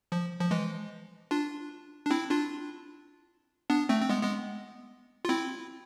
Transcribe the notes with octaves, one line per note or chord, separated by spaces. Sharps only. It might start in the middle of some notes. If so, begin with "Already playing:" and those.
F3
F3
E3 G#3
D4 F4
D4
C4 E4
D4 F4
B3 D4
A3 C4
C4
G#3 B3
G#3 B3
F4
C4 E4